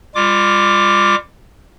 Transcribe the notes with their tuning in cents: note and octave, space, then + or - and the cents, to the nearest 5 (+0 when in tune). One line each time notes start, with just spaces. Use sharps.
G3 +35 F4 +0 D6 +0